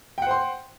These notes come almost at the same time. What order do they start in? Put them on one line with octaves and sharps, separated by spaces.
G5 F#5 C5 C6